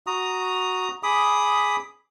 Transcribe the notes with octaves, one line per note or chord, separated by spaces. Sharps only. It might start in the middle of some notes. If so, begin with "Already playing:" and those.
F#4 A#5 D#6
G#4 B5 D6 D#6